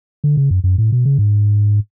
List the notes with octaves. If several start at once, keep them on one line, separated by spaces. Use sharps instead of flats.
D3
C#3
F#2
F#2
A2
B2
C#3
G#2